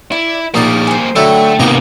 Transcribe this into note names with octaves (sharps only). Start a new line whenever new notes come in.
E4 D5
A#1 G3 A3 A#3 D#4 A#4 D5
C5 G#5
D3 F#3 A3 E4 G5
C3 A#3 B3 D#4 A#5